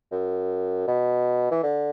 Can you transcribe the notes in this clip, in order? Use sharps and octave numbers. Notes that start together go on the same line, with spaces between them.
F#2
B2
E3
D3